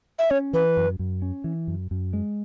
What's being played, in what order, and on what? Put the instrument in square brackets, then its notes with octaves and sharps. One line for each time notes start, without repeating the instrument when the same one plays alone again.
[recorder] E5
[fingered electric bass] C#4 [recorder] C#5
[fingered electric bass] E3 [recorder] B4
[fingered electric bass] F#2
F#2
C#4
E3
F#2
F#2
G#3